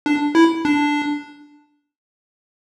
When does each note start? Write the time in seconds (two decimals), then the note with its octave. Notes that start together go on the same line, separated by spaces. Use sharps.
0.06 D4
0.35 E4
0.65 D4